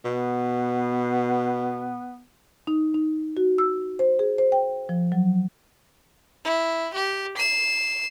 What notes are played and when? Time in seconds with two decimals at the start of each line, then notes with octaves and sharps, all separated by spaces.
0.05 B2 B3
2.67 D#4
2.94 D#4
3.37 F#4
3.58 E6
3.99 C5
4.19 G#4
4.38 C5
4.52 G5
4.89 F3
5.12 F#3
6.45 E4
6.94 G4
7.37 C7 E7